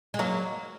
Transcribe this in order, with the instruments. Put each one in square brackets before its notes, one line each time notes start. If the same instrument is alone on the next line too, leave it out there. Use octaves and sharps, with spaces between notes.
[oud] G#3
[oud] F#3 [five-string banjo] A#3